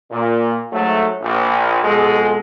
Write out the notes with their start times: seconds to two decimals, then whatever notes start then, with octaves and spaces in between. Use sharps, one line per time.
0.11 A#2
0.72 G#2 F#3 A3
1.22 A#1
1.83 F2 B2 G#3 G#4 A4